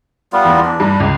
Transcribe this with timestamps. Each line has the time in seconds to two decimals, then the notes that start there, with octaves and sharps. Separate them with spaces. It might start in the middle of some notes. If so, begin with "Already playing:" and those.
0.33 G3 B3 F4
0.45 E2
0.65 D4
0.80 G2
1.00 C#2